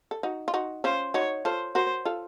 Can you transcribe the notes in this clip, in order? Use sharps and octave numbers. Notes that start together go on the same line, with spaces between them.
A4
D#4 F#4
F4
D#4 F#4
C#4 F4 C5
D#4 F#4 C#5
F4 A4 C5
F#4 A#4 C5
F4 A4